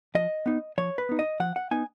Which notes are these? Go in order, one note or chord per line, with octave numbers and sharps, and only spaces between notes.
F3 D#5
B3 D#4
F3 C#5
B4
B3 D#4
D#5
F3 F#5
F#5
B3 D#4 G#5